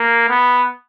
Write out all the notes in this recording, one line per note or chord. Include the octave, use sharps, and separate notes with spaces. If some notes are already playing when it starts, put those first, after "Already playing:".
Already playing: A#3
B3